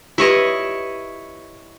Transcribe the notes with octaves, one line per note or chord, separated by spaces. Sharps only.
E4 F4 G4 B4 C#5 D#5